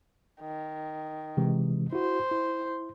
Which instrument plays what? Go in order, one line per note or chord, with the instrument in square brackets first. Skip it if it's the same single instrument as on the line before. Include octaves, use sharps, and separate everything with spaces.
[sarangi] D#3
[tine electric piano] C3 E3 G#3
[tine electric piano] E4 F#4 [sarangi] C5
[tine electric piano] E4